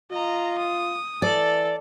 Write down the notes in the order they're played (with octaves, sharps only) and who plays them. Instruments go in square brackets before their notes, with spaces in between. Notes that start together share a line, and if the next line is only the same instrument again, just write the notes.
[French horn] F4 [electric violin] D#5 A#5
[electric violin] D#6
[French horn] E3 [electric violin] A4 [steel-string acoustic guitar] D5